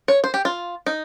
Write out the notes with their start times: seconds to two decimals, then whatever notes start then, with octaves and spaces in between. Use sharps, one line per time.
0.08 C#5
0.24 C5
0.34 G4
0.45 F4
0.86 D#4